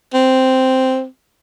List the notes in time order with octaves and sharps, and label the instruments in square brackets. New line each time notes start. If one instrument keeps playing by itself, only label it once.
[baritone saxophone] C4